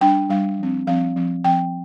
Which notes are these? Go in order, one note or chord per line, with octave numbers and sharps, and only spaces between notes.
G3 D4 G5
G3 D4 F5
F3 C4
F3 C4 F5
F3 C4
F3 C4 G5